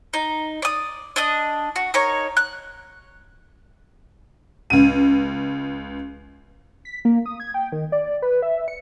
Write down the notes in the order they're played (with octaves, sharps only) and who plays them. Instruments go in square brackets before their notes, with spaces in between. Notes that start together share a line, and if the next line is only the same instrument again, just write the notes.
[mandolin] D#4
D5 D#6
D4 D#5 D#6
F#4
D#4 A#4 C#5 C#6
F#6
[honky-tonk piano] C#2 D#7
[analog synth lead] B6
A#3
D#6
G#6
G5
D#3
D5
B4
E5
C#7